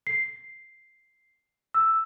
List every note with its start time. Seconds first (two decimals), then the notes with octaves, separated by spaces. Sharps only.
0.07 C7
1.74 E6